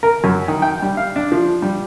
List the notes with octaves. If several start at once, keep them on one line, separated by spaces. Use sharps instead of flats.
A#4
F#2
D#3
G5
G3
F5
D4
F3
G3